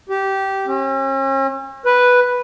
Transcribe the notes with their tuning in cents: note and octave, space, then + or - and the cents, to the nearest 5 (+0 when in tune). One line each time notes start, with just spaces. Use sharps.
G4 -15
C#4 -40
B4 -5